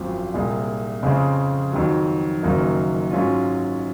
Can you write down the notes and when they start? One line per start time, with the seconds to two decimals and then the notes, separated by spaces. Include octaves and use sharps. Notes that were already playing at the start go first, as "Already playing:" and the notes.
Already playing: G#1 F#2 F3 C4
0.34 C2 A#2 G#3
1.03 F2 C#3 G#3 C4
1.73 F2 D#3 F#3
2.43 F#1 F#2 D#3 A#3 D#4
3.11 G#2 F#3 C#4 F4